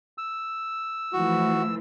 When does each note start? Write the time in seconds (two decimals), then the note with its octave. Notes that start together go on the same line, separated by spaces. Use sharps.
0.18 E6
1.13 E3 F3 A3 F#4